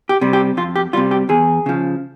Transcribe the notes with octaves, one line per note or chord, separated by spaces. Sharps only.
G4
C3 G3
G4
F2 F4
G4
C3 G3 F4
G4
E2 G#4
C#3 F3